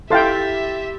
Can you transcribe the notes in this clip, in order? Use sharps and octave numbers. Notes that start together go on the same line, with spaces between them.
E4 G4 A4 E5 F5 G5 C6 A6